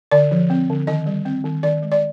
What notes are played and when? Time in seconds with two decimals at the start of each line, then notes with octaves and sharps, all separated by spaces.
0.11 D3 D5
0.31 F3
0.50 C4
0.70 D3
0.87 D#3 D#5
1.06 G3
1.25 C4
1.44 D#3
1.63 D#3 D5
1.82 G#3
1.92 D5